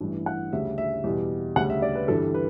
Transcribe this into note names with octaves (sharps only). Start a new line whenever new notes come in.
A1 G2 E3
F#5
D2 C#3 G3 E5
E5
E2 B2 G3
D2 C#3 G3 F#5
E5
D5
B4
G1 G2 E3 G3 A4
B4